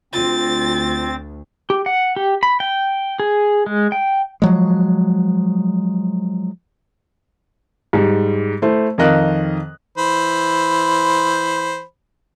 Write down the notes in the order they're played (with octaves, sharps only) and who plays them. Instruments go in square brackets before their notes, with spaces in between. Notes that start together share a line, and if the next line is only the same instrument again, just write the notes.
[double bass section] D2 [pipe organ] C4 [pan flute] F4 [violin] A6
[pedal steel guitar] G4
F#5
G4
B5
G5
G#4
G#3
G5
[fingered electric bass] F3 F#3 G#3
[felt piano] G#2 G3
A3 E4 C5
F2 D#3 A#4 D#5 F5 F#6
[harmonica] E3 C5 B5